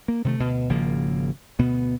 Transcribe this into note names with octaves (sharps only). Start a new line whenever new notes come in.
A#3
C3 D#3 G#3 A3
D2 B2
G#1 C#3 F3 A#3
D2 B2 B3